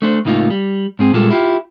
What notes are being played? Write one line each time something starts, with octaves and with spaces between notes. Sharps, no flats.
A3 D4 C5
C#2 A2 A#3 D#4 F4
G3
G#2 C4 G#4
A#2 G3 G#3 F4 A4
E4 F4 G4